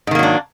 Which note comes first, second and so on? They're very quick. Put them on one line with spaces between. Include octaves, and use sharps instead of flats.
G#2 D#3 A#3 F#3 D4